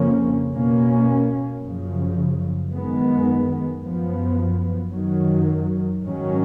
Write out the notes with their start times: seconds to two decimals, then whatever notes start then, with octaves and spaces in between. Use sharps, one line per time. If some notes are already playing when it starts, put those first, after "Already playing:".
Already playing: F2 C#3 F3 A#3 C#4
0.53 B2 A#3 C#4
1.63 F#2 C#3 F3
2.73 F#2 D#3 G#3 B3
3.83 F#2 F3 B3
4.93 F#2 D#3 F#3
6.03 G#2 D#3 F#3 C#4